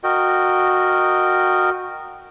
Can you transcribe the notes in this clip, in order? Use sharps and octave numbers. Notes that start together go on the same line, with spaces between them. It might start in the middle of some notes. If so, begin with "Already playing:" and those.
F#4 A#4 D#5 G5